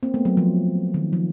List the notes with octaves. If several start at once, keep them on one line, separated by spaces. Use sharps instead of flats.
A#3 C4
A3 B3
F#3
F3
D#3
F3